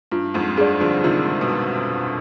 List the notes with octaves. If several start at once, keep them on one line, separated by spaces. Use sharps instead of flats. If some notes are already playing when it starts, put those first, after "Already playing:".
G2 F4
F2 G#2
G2 G#4 D5
D3 F3
C3 D#3 F4
B2